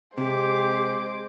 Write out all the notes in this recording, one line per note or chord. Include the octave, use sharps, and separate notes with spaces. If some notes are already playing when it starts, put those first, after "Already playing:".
C3 G#3 G4 C5 D6